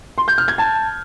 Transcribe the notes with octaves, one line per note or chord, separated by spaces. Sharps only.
C6
G6
F6
G#6
A5